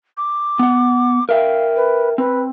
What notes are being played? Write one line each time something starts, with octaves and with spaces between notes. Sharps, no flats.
D6
B3 F#5
A#4 E5 F5 G5
B4
C4 B4